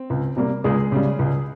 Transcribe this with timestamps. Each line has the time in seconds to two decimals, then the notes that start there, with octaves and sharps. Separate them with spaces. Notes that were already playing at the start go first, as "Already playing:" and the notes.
Already playing: C4
0.10 C#2
0.37 C3 G3 A#3
0.64 C#2 G#3 G#4
0.92 C#3 G3
1.19 C#2